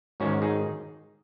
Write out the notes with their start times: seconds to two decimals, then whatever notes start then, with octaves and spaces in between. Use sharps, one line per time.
0.20 G#2 D#3 G#3 C#4 F#4
0.42 D#4 G#4